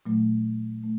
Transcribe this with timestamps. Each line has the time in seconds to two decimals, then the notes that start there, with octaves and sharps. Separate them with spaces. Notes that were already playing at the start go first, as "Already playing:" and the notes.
0.06 A#2 F#3 A3
0.84 A3